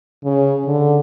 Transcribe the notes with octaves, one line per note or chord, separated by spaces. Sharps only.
C#3
D3